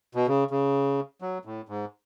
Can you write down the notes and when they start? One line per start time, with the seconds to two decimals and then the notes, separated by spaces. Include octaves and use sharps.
0.15 B2
0.28 C#3
0.51 C#3
1.22 F#3
1.45 A2
1.69 G#2